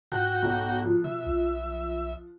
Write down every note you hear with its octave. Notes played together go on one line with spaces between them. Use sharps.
G#2 F#4 G5 F#6
B1
F3
B2 E5
B1